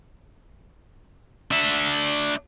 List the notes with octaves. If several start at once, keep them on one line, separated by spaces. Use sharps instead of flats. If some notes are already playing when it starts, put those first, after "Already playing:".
D4 E5